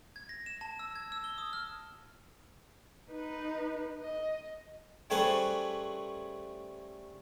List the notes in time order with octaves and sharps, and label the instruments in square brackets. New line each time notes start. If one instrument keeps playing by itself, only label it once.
[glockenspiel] G#6
A#6
E7
A5
E6
G#6
E6
G7
D#6
F6
[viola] D#4 B4
D#5
[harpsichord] G3 A3 C#4 G#4 B4 C5